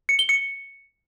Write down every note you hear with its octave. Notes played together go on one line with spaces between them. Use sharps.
C#7
G7
C#7